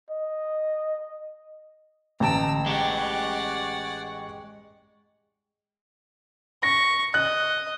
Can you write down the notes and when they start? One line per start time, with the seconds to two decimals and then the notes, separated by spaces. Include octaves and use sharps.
0.10 D#5
2.20 A1 D3 A5 A#5 E6 D7
2.66 G#3 G4 D5 F#5 C#6
6.63 C#6 A#6
7.14 D#5 F#6